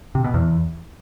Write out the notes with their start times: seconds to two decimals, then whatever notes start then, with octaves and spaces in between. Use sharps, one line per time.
0.15 C3
0.24 B2
0.34 E2